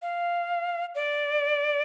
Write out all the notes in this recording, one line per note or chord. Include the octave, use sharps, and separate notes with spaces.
F5
D5